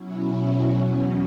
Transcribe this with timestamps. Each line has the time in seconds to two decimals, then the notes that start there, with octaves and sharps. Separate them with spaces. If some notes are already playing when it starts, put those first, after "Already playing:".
Already playing: B2 F#3 C#4 E4
0.67 E2 B2 F#3 C#4